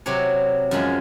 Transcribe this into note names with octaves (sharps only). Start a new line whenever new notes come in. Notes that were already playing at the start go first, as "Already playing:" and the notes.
C3 F#3 C4 C#5
F#2 F3 G#3 E5